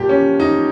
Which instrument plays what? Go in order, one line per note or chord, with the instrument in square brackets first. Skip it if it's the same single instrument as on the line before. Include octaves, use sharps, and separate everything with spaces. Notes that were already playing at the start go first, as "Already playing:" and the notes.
Already playing: [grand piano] A#2 F3 G4
C#4
D#4